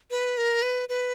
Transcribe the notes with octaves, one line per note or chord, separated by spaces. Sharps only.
B4
A#4
B4
B4